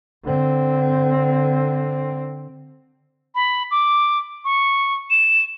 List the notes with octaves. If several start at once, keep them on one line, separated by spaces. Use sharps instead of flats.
D3 C4
B5
D6
C#6
E7